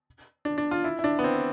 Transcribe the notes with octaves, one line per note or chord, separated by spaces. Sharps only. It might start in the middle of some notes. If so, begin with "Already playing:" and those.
D4
D4
F4
E4
E4
D4
B3
C4